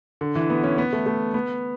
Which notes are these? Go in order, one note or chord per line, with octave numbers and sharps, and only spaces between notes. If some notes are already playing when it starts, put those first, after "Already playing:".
D3
E3
B3
C#4
B3
A3
A3
B3